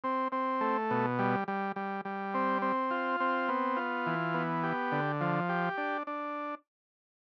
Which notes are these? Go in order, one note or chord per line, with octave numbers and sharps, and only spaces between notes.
C4
C4
A3
B2
G3
G3
G3
G3
C4
C4
F4
C4
B3
F4
E3
B3
G4
D3
F3
G4
D4
D4